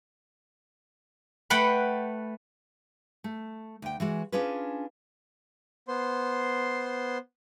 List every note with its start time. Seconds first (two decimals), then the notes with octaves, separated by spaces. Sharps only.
1.50 A3 B4 F#5 G5 B5
3.24 A3
3.82 D2 G5
4.00 E3 G#3 F#4
4.32 C#4 D4 F4 G#4 B4
5.88 B3 C5 C6